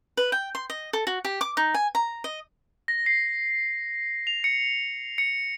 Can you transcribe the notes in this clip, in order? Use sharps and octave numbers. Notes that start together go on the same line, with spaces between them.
B4
G5
C6
D#5
A4
F#4
G4
D6
D#4
G#5
A#5
D#5
A#6
C7
F7
C#7
C#7